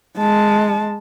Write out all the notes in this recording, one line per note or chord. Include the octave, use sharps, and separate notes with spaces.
G#3 A5